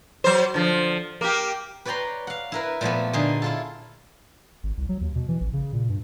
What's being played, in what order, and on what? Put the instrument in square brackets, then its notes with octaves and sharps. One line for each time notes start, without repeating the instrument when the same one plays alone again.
[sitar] F#3 C5
D3 F3
A#3 G4
[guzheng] B4 C#5 D5 G5 A#5 C6
F5 F#5
E4 A#4 B4
A#2 F3 A3 B3
A#2 D3 D#4 G#4
E4 F4 A4
[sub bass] G#1
C2
F#3
D#2
B2
E3
A1
C#3
A#2
G2